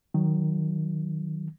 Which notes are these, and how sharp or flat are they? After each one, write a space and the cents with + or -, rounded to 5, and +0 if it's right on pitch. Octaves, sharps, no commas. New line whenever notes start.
D#3 +0 F#3 +0